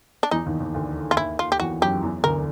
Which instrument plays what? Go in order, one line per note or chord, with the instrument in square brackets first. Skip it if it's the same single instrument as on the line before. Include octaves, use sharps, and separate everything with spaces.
[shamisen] D4
[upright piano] E2 E3 [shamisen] D#4
[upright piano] D#2 D#3
D#2 D#3
D2 D3
[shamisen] F4
[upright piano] D#2 D#3 [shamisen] E4
[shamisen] F4
G4
[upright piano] E2 E3 [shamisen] F#4
[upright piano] F#2 F#3 [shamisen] G4
[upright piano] E2 E3
[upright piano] D2 D3 [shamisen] A#4